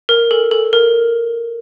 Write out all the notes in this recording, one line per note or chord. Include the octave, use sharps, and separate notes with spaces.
A#4
A4
A4
A#4